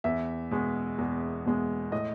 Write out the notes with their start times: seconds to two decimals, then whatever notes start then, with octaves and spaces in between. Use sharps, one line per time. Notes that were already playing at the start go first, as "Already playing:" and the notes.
0.04 E2 E5
0.51 B2 G#3
0.98 E2
1.45 B2 G#3
1.92 A2 D#5